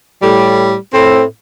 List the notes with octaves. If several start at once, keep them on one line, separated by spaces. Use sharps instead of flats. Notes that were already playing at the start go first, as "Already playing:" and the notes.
A2 G3
A2 C4